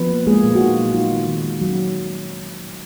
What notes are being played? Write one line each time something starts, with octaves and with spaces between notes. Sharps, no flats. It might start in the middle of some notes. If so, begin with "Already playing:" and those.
Already playing: F3 B3 B4
A#3
G#3 A#3 G#4
A#2
F#4
D#4 F4
F#3
D#4 F4
D#3
D#3
G#3
F#3 C#4 F#4